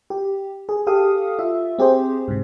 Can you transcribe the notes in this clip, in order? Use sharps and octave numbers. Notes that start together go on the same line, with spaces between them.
G4
G#4
G4 A4 F5 D#6
F4 E5
C4 G4 G#4 C5
G#2 C3